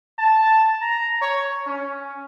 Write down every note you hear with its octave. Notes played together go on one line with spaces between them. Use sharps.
A5
A#5
C#5
C#4